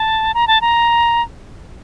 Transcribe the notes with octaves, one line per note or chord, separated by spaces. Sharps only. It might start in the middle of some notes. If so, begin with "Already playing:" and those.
Already playing: A5
A#5
A5
A#5